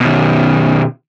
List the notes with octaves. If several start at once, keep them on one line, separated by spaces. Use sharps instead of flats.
B2 D#3